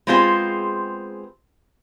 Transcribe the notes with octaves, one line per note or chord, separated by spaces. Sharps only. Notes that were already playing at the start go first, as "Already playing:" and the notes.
G#3 B3 C4 F4 G#4 C5